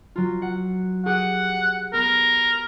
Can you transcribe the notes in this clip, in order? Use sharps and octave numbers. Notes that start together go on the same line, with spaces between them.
F#3 F4
F#5
G4 G#4 F#5
B3 A#4